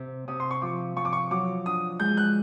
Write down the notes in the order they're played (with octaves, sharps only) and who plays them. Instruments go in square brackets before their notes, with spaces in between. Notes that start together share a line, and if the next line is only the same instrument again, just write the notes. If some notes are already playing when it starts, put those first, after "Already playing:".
Already playing: [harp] C3
[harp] C3 [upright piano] D#6
[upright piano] C6
C#6
[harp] F3 [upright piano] D6
[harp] F3 [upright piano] C#6
[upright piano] D6
C#6
[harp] F#3 [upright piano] D6
[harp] D4 [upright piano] D#6
[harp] G#3 [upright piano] G6
[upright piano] F#6